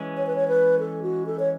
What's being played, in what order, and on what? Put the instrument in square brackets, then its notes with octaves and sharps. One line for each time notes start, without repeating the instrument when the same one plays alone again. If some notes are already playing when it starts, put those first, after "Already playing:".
Already playing: [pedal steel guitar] E3 G#3 C#4
[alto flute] C#5
B4
C#5
B4
A4
F#4
A4
C#5